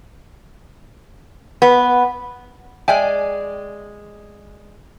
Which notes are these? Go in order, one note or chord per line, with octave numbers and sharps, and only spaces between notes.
B3
G#3 D5 E5 G5 G#5